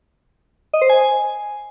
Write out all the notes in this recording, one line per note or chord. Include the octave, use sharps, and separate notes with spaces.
D#5
C5
G#5